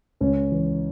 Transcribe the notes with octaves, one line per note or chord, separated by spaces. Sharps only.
C#2 C#4
E3